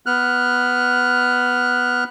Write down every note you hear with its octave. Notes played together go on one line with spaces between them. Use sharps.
B3 F6 F#6